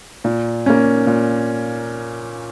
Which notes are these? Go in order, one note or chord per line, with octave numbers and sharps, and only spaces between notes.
A#2
A#3 C#4
A#2